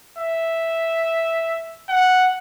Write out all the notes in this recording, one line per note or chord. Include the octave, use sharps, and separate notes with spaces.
E5
F#5